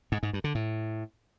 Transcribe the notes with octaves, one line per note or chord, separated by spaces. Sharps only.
G#2
G#2
G2
D3
A2